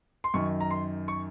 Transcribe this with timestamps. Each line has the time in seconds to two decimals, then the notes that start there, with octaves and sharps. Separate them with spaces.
0.24 C6
0.34 F#2 D#3 C#6
0.60 A#5
0.71 C6
1.08 C#6